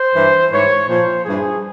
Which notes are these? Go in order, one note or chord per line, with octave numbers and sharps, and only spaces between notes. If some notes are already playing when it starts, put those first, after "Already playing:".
Already playing: C5
G2 E3
G#2 E3 C#5
A#2 F3 C5
G2 E3 G#4